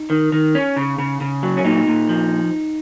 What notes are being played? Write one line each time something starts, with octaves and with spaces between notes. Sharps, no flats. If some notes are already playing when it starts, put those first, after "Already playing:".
Already playing: D#4
D#3
D#3
C#4
C#3
C#3
C#3
F#3
C#4
A#2 D#4
A#2
F3